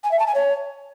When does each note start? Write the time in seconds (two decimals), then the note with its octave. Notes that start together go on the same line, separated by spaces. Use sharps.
0.03 G#5
0.11 E5
0.19 A5
0.26 G#5
0.34 C#5